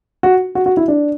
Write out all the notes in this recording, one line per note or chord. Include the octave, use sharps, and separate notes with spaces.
F#4
F#4
F#4
E4
D4